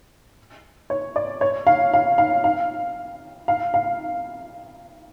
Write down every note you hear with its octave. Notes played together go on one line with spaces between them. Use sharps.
C#5
D5
C#5
F5
F5
F5
F5
F5
F5